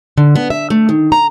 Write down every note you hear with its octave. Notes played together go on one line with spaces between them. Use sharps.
D3
B3
E5
A3
D#3
A#5